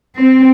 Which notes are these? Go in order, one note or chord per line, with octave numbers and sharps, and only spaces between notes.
C4